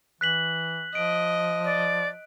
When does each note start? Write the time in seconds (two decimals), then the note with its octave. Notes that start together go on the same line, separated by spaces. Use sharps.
0.21 E3 F#6 B6 F#7
0.95 F3 D#5 D7
1.64 D5